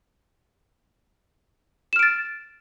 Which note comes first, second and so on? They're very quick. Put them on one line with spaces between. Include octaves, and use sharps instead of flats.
E7 F6 D7 A6